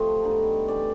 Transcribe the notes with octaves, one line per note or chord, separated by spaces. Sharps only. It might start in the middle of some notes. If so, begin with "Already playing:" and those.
Already playing: C3 F3 A3 D#5
D3 G3 B3 D#4
C3 E3 A3 D5